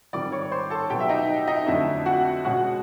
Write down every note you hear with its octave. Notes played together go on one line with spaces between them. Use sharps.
G#2 D#3 G3 C4 D5 D6
C#5 C#6
C5 C6
A4 A5
B2 F#3 B3 G4 G5
E5
D#4 D#5
D#4 D#5
F2 D3 F#3 A3 D4 E4 E5
F#4 F#5
B2 G#3 C#4 F#4 F#5